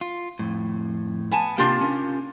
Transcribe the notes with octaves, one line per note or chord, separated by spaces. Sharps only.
F4
F2 A2
B3 G#5 A5
C3 A#3 D4 F4 G4
C#4 A#4 F5